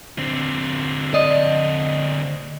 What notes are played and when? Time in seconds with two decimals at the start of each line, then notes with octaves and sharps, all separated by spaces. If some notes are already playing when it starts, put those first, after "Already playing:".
0.18 D3 C4
1.14 D5 D#5